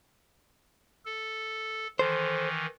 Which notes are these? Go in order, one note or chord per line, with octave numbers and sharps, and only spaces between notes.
A4
D#3 E3 A4 C5